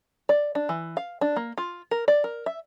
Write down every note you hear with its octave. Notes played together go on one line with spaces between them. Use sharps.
D5
D4
E3
F5
D4
A#3
F4
A#4
D5
A#4
E5